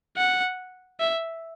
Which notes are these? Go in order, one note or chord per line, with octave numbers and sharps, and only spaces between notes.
F#5
E5